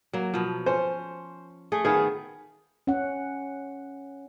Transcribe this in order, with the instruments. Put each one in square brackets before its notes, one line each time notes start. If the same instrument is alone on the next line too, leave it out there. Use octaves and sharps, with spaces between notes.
[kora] F#3 A#3
B2 F3
[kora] C#4 [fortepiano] C5
[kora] A3 G#4
[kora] D#3 B3 F5 [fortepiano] G#4
[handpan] C#4 F#5